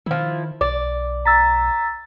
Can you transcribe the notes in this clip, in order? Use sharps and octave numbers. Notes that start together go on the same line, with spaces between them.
D#3 F3 E4
B1 D5
A#5 E6 A6 B6